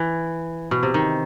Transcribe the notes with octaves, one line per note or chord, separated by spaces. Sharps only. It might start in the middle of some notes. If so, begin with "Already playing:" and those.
Already playing: E3
B2
C3
D#3